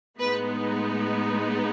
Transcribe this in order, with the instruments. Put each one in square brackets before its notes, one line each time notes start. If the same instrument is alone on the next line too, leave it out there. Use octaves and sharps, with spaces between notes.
[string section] A2 G#3 B3 D#4 B4